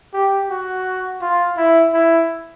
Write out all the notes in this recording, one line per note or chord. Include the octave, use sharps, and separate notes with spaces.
G4
F#4
F4
E4
E4